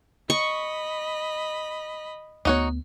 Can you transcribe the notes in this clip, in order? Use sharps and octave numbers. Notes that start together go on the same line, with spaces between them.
D#5 B5 C#6
D2 B3 D#4 F#4 C#5